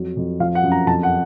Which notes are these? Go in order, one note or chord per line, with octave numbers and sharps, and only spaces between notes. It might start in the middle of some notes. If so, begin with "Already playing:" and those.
Already playing: F2 F#3
F2
F3 F5
F#5
F#2
A#5
F2 A5
F#5